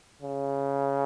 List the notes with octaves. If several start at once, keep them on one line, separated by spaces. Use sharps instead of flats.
C#3